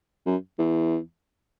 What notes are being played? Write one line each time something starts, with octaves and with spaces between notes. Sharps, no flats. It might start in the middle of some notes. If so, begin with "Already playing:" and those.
F#2
E2